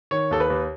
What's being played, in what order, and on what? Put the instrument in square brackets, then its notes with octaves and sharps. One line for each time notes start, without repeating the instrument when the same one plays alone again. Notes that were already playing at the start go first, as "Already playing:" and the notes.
[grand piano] D#3 C#5
D#2 A4
B4
D#2